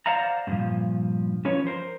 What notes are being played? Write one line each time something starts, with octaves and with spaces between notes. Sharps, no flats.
C5 D5 F5 F#5 A#5
G2 A#2 F3
F3 C#4 B4 C#5
A#4 C5